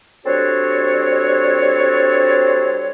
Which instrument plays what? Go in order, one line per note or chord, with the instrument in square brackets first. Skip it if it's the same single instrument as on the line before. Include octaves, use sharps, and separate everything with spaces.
[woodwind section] G3 C4 D4 F#4 A4 C#5